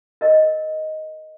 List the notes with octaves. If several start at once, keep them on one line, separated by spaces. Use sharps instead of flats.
A#4 D#5